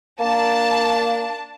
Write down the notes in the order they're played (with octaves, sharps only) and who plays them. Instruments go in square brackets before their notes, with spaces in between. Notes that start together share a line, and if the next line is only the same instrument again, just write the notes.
[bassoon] A#3 [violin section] D4 A5